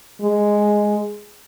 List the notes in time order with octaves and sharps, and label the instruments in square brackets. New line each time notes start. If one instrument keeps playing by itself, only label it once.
[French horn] G#3